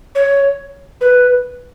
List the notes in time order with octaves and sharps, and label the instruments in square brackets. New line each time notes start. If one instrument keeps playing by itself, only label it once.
[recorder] C#5
B4